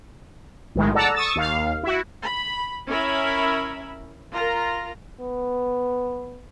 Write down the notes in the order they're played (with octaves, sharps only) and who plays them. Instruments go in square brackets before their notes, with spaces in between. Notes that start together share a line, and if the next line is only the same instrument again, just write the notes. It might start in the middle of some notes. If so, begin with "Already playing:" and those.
[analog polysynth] B1 A2 D#3 G#3
A4 D5 F#5 A5 A#5 E6
C#6 D#6 E6 A6
D#2 F5
E4 F#4
[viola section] B5
C#4 E4 A#4 C#5 E5 B5
F4 A#4 A#5
[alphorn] B3